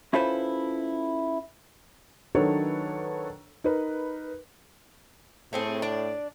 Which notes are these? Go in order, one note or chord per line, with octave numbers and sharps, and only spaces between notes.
C#4 E4 F4 A4 B4 C5
D#3 F#3 D4 A4 B4 C#5
D#4 A#4 B4
A2 A3 C4 G#4
D4 D5